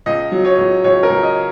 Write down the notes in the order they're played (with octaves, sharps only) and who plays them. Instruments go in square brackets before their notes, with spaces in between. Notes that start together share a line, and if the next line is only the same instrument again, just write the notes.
[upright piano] C#2 D#5
F#3
C#5
C#2
C#2 C#5
A#4
C#2
D#5